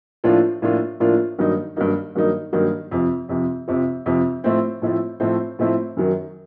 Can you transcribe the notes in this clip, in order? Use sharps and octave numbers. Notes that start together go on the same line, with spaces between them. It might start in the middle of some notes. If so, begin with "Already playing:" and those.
A2 F3 A#3 D4 F4
A2 F3 A#3 D4 F4
A2 F3 A#3 D4 F4
G2 D#3 F#3 A#3 D#4
G2 D#3 F#3 A#3 D#4
G2 D#3 F#3 A#3 D#4
G2 D#3 F#3 A#3 D#4
F2 C3 F3
F2 C3 F3
F2 C3 F3
F2 C3 F3
A2 F3 A3 C4 E4
A2 F3 A3 C4 E4
A2 F3 A3 C4 E4
A2 F3 A3 C4 E4
F#2 D#3 F#3